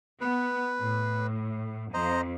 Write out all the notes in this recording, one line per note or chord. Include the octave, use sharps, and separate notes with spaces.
B3 B4
A2
F2 C5 D#5 A#5